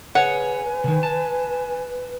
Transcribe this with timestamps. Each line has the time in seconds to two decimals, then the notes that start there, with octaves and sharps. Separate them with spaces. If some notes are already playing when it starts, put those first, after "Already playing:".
0.15 G#4 B4 C#5 F#5 G#5
0.84 C3 D#3
1.03 A5